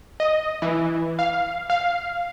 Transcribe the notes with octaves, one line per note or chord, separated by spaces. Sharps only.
D#5
E3
F5
F5